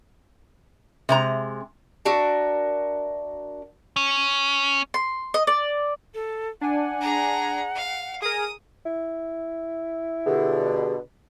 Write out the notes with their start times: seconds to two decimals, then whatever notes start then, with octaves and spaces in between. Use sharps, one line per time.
1.09 C3 G#3 A#5
2.05 D4 F#4 A#4 E5
3.96 C#4
4.94 C6
5.34 D#5
5.47 D5
6.14 A4
6.61 D4 F#5 G#5
7.01 G#4 A#5
7.75 F5
8.22 G#4 A#4 D#6
8.85 E4
10.26 B2 D3 G4 G#4